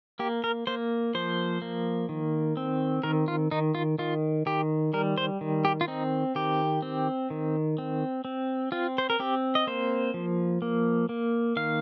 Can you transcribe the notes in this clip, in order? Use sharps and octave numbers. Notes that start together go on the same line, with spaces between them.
A#3 G4
A#4
A#3 C5
F3 C5
A#3
D#3
C4
D#3 A#4
F4
D#3 D#4
F4
D#3 F4
D#3 G4
G3 A#4
C5
D#3
G4
F4
C4 D#4
D#3 G4
C4
D#3
C4
C4
C4 F4
C5
A#4
C4 G4
D#5
A#3 C5
F3
A#3
A#3
D#3 F5